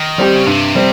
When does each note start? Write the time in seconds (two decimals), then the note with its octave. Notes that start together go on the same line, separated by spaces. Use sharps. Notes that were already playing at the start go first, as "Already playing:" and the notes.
Already playing: D#3
0.18 G3 C4 G4
0.36 C#3
0.46 G2 C3
0.75 G3 C4